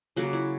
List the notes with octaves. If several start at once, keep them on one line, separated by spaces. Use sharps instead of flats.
C#3 F#3 A#3 F#4
E4